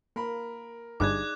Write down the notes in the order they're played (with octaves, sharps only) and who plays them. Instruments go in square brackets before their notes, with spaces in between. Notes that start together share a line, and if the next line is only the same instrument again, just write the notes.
[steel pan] A#3 [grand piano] A#4 B5
[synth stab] G1 G2 [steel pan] D#4 G#4 D5 [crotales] D6 F#6 G#6